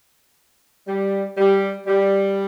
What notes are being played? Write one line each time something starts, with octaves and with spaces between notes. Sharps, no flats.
G3
G3
G3